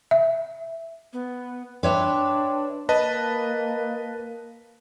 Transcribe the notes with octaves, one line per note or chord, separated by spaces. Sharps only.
E5
B3
D4 B4 C#5 E5 G5 C6 D6
A#3 B4 D#5 A5